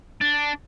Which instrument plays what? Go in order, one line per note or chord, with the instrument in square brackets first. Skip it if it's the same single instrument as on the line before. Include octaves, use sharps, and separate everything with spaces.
[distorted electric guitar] D4